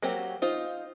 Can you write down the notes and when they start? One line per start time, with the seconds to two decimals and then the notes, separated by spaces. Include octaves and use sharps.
0.02 F#3 A#3 C4 F#4 G4
0.42 D#4 F4 C5